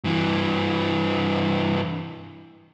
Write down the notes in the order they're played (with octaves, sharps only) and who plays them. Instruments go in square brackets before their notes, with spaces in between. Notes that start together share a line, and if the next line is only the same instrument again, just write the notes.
[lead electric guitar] G2 E3